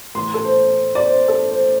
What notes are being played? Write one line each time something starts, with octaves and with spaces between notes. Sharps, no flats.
A2 E3 C6
A4
C5
D5
C5
A4
C5